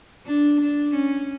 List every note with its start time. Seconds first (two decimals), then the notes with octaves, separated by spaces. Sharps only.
0.26 D4
0.60 D4
0.94 C#4